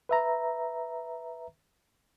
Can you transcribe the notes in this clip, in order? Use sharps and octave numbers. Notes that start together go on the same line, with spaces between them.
B4 E5 A#5